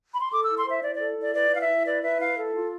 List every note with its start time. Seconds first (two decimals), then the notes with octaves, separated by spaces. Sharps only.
0.12 B5
0.22 C6
0.31 A4 D6
0.44 E4 E6
0.57 C6
0.66 C5 E5
0.83 E4 D5
0.96 A4 D5
1.17 E4 D5
1.34 B4 D5
1.51 E4 F5
1.60 E5
1.68 E4
1.86 B4 D5
2.03 B4 E5
2.20 E4 F5
2.37 A4
2.54 F4